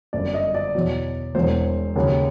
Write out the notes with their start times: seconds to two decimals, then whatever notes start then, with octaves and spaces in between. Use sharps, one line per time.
0.13 G1 F#2 D3 D5
0.34 D#5
0.55 D5
0.75 E2 B2 F#3
1.35 E1 E2 B2 F#3 C5
1.96 D#2 C#3 F#3